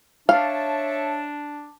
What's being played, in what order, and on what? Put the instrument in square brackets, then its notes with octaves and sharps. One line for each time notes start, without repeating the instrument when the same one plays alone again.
[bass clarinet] D4 [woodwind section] C#5 E5 A5 [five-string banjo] F5